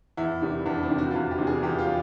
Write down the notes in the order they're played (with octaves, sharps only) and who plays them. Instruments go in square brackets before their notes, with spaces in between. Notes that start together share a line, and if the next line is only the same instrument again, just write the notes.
[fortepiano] E2 [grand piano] E4
[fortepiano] C3 D#3 G3
[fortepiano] E2 [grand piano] D4
[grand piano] C4
[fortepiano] C3 D#3 G3
[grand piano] F#4
F4
[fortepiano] E2 [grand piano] F#4
[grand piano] G4
[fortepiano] C3 D#3 G3
[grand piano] G#4
[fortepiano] E2 [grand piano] G4
[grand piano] F4
[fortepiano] G3